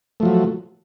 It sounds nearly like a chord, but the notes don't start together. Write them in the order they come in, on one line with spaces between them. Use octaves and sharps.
A3 F3 F#3